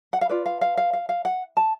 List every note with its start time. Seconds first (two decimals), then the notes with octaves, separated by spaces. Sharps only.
0.13 F#5
0.21 F5
0.29 F4 B4 D5
0.46 F5
0.61 F5
0.77 F5
0.93 F5
1.09 F5
1.25 F#5
1.57 A5